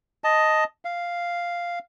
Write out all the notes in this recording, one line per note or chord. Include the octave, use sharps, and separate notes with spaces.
D#5 A5
F5